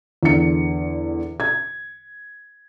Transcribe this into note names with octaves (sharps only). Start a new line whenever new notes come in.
E2 D3 C#7
G#6